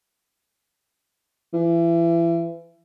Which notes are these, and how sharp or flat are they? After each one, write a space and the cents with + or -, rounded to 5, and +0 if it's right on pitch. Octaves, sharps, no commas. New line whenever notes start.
E3 +30